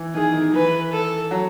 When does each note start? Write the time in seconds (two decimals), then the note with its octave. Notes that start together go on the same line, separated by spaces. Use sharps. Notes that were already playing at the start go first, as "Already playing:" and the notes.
Already playing: E3
0.14 D#3 G#4
0.34 D#3
0.54 E3 B4
0.92 A4
1.31 F#3